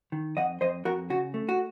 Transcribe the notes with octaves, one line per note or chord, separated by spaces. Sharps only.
D#3
F2 D#5 F#5
F2 C5 D#5
F2 F#4 A#4
C#3 F#4
A3
F#4